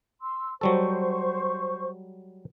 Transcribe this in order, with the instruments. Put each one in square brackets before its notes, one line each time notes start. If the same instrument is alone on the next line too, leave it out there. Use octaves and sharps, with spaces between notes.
[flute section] C6 E6
[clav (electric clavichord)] F#3 G3 A4 [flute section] C5 C#6